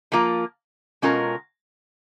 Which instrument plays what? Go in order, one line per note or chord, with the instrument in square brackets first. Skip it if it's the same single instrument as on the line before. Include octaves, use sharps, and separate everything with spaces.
[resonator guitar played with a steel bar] F3 A#3 F4
B2 G#3 C#4 F4 A#4